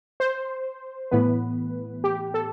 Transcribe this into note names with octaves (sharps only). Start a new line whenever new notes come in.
C5
A2 E3 B3 B4
G4
A4